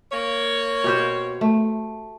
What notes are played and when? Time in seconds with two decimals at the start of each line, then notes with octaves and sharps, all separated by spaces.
0.12 A#3 C#5
0.84 B2 G4 C5
1.41 A3